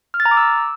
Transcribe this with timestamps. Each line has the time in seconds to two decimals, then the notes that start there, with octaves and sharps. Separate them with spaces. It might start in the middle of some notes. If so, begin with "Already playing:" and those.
0.14 F6
0.20 A6
0.26 A#5
0.31 D6
0.37 E6